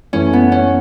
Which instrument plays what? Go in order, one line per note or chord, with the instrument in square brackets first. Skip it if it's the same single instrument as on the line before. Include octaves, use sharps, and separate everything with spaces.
[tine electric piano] F#2 E3 A3 E4 [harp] C#4
[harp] B3
C#4